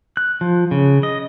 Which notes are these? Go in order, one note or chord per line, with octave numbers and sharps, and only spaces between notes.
F#6
F3
C#3
D#5